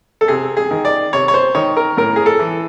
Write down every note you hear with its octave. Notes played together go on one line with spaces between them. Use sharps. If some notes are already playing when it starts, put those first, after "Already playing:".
A4
C3 G#4
G#4
D#3
D5
C3 C#5
C#5
C5
D#3 C#5
A#4
A2 A#4
G#4
A4
E3